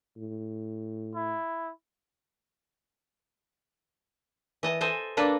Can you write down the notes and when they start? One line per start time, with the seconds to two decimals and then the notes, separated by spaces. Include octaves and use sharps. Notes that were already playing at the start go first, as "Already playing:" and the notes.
0.16 A2
1.15 E4
4.63 E3 D#5 A5
4.81 A4 C5 D#5 G#5
5.17 A#3 D4 A4 B4